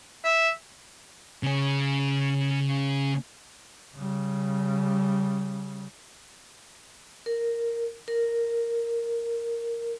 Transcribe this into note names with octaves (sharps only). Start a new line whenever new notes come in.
E5
C#3 C#4
C#3 G3
A#4
A#4